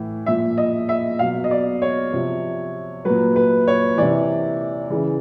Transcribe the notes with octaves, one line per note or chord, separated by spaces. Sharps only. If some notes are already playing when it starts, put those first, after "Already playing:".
Already playing: A2 E3
A#2 F3 E5
D#5
E5
B2 F#3 F5
D#5
D5
C#5
C3 F3
F#3 B4
A#2
B4
C#5
C3 E3 D5
C#3 E3